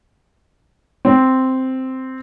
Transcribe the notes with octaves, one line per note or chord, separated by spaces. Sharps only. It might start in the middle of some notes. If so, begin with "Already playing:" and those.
C4